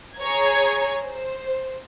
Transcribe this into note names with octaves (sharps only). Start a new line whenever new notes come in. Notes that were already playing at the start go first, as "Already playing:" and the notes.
G#4 C#5 A#5 G#6
C5